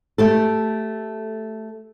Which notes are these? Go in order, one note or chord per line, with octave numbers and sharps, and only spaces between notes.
A3 G4 A4